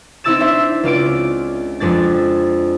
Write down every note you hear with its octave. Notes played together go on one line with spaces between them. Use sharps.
C4 D#4 E4 E6 A6 E7
D4 C5 E5
C#2 F4 D5 D7
F2 G#3 D4 A6